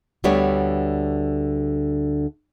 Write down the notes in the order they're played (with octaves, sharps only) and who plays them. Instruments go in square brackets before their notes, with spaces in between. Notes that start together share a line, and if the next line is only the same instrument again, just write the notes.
[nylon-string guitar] D2 D3 G3 B3 C#5